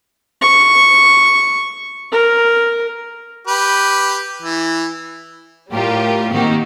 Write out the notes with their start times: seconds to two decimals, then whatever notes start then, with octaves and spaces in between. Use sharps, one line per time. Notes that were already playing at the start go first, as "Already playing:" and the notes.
0.41 C#6
2.12 A#4
3.47 G4 B4
4.42 E3
5.71 A2 G3 F4 G4 A#4
6.33 D#3 A#3 C4 F#4 G4